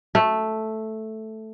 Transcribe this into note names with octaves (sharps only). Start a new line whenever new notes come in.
A3